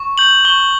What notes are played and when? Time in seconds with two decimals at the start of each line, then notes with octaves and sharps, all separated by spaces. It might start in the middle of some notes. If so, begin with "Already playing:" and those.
Already playing: C#6
0.18 G6 F#7
0.45 C#6 G7